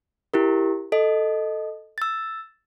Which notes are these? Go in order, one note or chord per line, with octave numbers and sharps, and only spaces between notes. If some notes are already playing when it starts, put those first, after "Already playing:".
E4 G4 A#4
A4 D#5
E6 A6